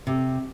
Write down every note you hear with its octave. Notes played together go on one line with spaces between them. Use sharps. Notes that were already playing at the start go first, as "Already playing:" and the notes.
C3